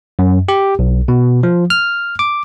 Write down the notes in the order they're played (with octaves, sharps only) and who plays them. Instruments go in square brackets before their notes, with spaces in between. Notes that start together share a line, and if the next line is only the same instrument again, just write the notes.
[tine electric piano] F#2
G4
B1
B2
F3
F6
D6